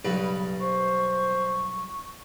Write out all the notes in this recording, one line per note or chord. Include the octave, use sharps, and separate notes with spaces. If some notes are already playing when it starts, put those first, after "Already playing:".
B1 G2 C#3 G3 B4
C5 C#6